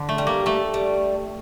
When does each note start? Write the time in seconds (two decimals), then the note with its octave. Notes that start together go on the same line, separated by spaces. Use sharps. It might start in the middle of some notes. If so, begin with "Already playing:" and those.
Already playing: D3 D4
0.09 A3
0.18 G3
0.27 A#3
0.46 A3 A4
0.74 G3